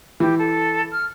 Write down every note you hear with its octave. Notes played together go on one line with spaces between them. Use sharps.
E3 G4
A4
F6